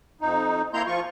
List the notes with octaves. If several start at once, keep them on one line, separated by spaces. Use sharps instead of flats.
F2 D#4
A#3 C4 E4 A#5 C6 G6
F3 F4 C#6